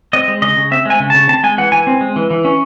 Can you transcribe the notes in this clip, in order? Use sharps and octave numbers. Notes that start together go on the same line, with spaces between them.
C4 D#5
G#3
C#3 D#5
C#3
C4 E5
G#3 G#5
C#3
C#3 A5
C4 A5
G#3 G#5
E3 F#5
E3 G#5
C4
G#3
E3
E3
C#4